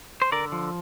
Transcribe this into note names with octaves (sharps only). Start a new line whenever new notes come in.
C5
D3 A#4 D5
F3